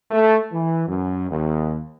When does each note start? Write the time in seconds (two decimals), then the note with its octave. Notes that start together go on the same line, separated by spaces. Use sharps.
0.11 A3
0.52 E3
0.87 F#2
1.30 D#2